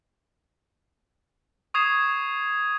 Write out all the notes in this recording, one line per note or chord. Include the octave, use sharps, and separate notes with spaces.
C#6 D#6 G#6 C7 E7